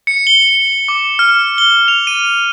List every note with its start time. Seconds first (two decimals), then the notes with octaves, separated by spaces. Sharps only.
0.07 C#7
0.27 G7
0.88 D6
1.19 F6
1.58 G7
1.88 F7
2.07 D#7